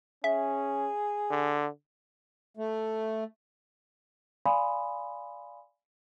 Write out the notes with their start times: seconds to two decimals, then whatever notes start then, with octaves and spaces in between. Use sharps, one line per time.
0.24 C#4 G#4 E5
1.30 D3
2.57 A3
4.46 D5 F5 G#5 B5 C6 D#6